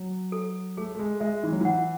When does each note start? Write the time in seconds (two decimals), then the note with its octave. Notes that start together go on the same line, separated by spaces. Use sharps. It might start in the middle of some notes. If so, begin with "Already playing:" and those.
Already playing: F#3
0.32 A4
0.77 A3 G#4
0.95 A3
0.99 G#3
1.20 G#3 E5
1.44 E3
1.52 F#3
1.61 E3 F#5